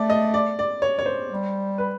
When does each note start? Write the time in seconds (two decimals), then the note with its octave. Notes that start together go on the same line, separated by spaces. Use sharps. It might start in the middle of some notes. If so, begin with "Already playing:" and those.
Already playing: A3 D5
0.10 D#5
0.34 D5
0.59 D5
0.82 C#5
0.99 C#5
1.06 C5
1.31 G3
1.78 B4